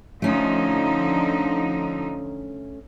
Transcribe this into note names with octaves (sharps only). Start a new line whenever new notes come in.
D3 F3 A3 C#4 D#4